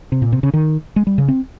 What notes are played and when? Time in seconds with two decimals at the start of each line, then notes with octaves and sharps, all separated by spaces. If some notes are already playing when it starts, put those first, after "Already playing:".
0.12 C3
0.22 A#2
0.32 C3
0.43 C#3
0.53 D#3
0.96 G#3
1.07 G3
1.18 C#3
1.28 C4